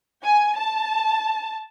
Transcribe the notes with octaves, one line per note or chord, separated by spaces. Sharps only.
G#5
A5